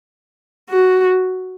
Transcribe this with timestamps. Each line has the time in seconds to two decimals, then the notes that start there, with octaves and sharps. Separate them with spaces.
0.70 F#4